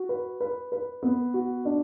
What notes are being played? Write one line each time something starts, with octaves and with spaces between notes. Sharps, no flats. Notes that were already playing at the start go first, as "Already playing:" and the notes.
Already playing: F#4
B4
B4
B4
B3
F#4
D4